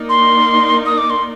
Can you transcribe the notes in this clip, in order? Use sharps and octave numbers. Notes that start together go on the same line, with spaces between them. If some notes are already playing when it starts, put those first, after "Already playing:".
Already playing: A#3 D#4 A#4 D5
C6
D#6
D6
C6